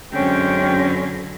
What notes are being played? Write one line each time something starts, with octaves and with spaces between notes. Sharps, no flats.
F#2 D3 G#3 C4 C#4 G5